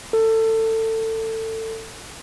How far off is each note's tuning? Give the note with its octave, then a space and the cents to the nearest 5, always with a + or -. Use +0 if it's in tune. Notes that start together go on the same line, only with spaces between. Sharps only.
A4 +25